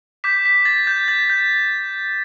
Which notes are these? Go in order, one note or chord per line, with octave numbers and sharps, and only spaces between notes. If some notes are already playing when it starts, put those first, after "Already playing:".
D6 G6 B6
B6
A6
G6
A6
G6